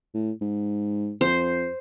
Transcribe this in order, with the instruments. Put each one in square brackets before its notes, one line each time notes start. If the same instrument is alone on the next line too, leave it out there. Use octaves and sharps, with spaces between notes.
[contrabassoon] A2
G#2
[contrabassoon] F2 [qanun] C5